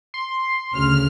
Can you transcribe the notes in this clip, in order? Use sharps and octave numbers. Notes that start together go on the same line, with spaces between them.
C6
D2 C#3 F6